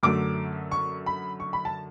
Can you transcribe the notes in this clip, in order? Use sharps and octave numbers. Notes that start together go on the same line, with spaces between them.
F#2 D3 F#3 A3 D6
C#6
B5
C#6
B5
A5